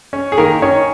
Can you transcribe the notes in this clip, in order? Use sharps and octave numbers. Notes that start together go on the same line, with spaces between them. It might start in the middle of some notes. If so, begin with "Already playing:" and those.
C#4
G#4
D#3 A#3 A#4
D#3 C#4 C#5